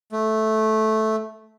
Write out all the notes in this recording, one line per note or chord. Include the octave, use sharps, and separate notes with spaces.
A3